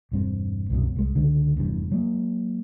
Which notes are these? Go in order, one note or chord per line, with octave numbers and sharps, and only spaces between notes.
E1 G2 C4
C2 F#2 B2
C2 G#3
C#2 D3
F1 E2 G2
F#3 G#3 A#3